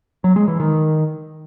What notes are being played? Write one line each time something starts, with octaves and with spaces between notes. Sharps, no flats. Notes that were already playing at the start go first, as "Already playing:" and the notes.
F#3
G#3
E3
D#3